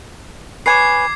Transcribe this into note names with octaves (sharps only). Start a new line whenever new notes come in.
B4 C#5 G#5 D6 G#6 C7